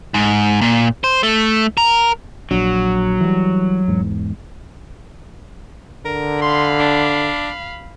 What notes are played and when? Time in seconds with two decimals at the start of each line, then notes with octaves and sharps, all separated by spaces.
0.14 G#2
0.61 A#2
1.04 C5
1.23 A3
1.77 A#4
2.51 A#1 F#3 D4
3.21 E3 G3
3.88 E2 G#2
6.05 D3 A#4
6.41 F5 B5 C6
6.79 D4